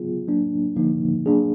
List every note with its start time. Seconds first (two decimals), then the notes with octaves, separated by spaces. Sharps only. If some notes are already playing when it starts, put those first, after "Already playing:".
Already playing: F#3 B3 F4 G#4
0.27 F#3 A#3 D4
0.76 D3 F3 A#3 D#4
1.26 F#3 A#3 D4 G#4